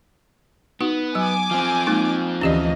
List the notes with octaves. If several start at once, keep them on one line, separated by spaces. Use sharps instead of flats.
B3 D#4 F#4
F#3 G#5 D6
F3 C4
G#3 A#3 D#4
D2 E3 C#4 G4 D5 D#5